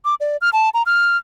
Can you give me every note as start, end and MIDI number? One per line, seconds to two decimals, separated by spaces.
0.05 0.15 86
0.20 0.37 74
0.41 0.50 89
0.53 0.69 81
0.74 0.83 82
0.86 1.17 89